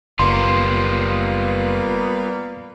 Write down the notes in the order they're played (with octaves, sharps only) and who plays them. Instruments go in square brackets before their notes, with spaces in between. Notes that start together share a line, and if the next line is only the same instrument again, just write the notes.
[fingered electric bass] F#1 [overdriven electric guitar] G3 F4 [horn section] A#3 B3 [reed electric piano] C6